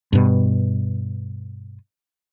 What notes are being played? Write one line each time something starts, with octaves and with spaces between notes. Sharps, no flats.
G2 B2